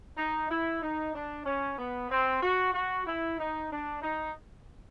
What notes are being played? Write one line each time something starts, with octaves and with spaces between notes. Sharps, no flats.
D#4
E4
D#4
D4
C#4
B3
C4
F#4
F#4
E4
D#4
D4
D#4